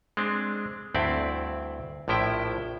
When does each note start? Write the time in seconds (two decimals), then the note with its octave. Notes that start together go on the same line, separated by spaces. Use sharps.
0.17 G#3 C4 D4
0.94 D2 G2 C4 E4 D5
2.08 A#1 A2 F3 E4 G5